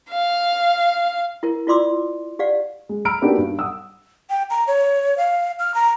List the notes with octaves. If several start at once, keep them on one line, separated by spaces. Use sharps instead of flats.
F5
E4 A#4
E4 F4 D5 C6 D6 E6
G4 D5 F5 F#5
G#3
A#5 B5 E6 F6 D7
A#3 B3 D4 D#4 F#4 G4
G2
F#5 D#6 E6
G5
A#5
C#5
F5
F6
A#5